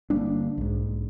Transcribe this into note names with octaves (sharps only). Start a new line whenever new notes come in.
G1 G3 A#3 D4
B1 G#2